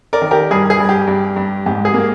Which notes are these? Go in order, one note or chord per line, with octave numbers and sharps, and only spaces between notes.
A#4 D5
D#3
G4 A#4
G2 G#4
G#4
G2
G4
G2
G2
G#2 G4
G#4
A#3